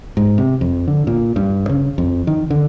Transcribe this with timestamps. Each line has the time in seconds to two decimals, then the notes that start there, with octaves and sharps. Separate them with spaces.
0.17 G#2
0.38 C3
0.61 F2
0.88 D3
1.07 A#2
1.36 G2
1.69 C#3
1.98 F2
2.27 D#3
2.50 D3